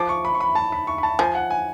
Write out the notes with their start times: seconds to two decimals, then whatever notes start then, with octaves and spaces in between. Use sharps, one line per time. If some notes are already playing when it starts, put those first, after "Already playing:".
Already playing: F3 D6
0.09 C#6
0.25 B5
0.34 C#6
0.41 B5
0.55 A5
0.72 B5
0.87 C#6
0.98 B5
1.03 A5
1.19 F3 G#5
1.35 F#5
1.50 G#5